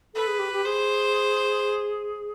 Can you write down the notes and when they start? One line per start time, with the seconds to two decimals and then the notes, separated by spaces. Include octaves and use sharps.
0.14 A4 B4
0.27 G#4
0.39 G4
0.53 G4
0.65 G#4 C5